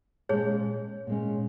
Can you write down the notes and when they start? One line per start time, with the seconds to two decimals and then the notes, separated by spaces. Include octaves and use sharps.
0.29 A#2 G#3 C#4 G#4 C#5
1.07 A#2 G#3 C#4